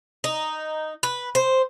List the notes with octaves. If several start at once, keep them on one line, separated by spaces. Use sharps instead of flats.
D#4
B4
C5